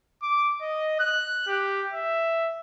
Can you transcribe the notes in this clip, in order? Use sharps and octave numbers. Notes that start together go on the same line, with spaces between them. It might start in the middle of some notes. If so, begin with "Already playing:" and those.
D6
D#5
F#6
G4
E5